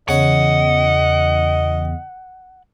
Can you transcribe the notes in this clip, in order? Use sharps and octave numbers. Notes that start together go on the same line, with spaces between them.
E2 C#3 C#5 D#5 F#5